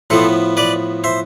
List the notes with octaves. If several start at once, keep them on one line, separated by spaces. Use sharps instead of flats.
A2 F3 B3 A4 C5
B4 D5
C5 E5